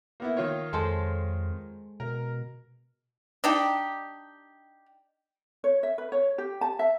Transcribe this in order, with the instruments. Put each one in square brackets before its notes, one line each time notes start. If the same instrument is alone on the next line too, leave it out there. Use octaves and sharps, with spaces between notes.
[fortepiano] A#3 B3 E4
D#3 F4 C#5
[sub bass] F2 [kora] G#3 A4 C5
[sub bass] B2 [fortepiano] A#4
[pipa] D4 D#4 G4
[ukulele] C#5
E5
B4
C#5
G4
A5
E5